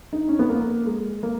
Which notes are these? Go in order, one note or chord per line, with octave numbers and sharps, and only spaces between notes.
D#4
C#4
B3
A#3
G#3
A#3